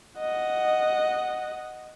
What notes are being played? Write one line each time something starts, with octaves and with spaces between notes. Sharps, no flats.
D#5 F#5